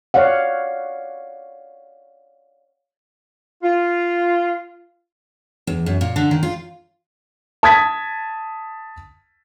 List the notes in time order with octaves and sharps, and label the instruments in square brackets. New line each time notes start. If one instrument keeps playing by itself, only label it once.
[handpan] C#5 D5 F5 F#5
[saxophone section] F4
[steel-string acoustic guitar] E2
F#2
A#2
D3
D#3
F4
[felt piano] A5 D#6 G#6 B6